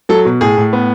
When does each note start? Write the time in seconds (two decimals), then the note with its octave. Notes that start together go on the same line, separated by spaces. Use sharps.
0.09 F#3 A4
0.25 B2
0.41 A2 G#4
0.58 A2
0.73 B3